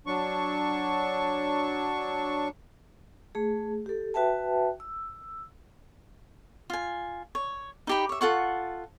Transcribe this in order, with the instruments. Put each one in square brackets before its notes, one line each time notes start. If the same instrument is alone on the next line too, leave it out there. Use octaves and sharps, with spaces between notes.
[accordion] F#3 D4 C#6
[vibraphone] A3 G#4
G4 A4
F#4 B4 E5 G5 A5
E6
[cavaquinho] F4 G#5
C#5
D#4 G4 B5
C#5 E5
F4 A4 F#5 C#6